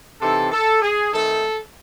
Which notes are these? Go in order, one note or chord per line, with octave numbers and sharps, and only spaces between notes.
C3 E3 C4 D#4 A4
A4
G#4
D#3 A3 C4 D#4 A4